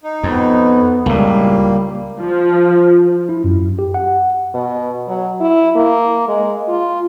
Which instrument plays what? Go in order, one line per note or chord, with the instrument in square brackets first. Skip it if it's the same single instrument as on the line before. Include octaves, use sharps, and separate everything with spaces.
[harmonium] D#4
[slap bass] F2 [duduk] B3
[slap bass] C#2 A2 [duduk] G3 [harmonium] A#3
[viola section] F3
[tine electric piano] E4
F#2
G4
F#5
[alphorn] B2
F#3
E4
A#3
G#3
F4